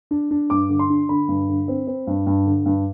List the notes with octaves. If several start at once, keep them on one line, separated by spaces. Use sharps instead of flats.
D4
D4
G2 D6
D3
C6
D4
D3 B5
G2
D3
C4
C4
G2
G2
D3
G2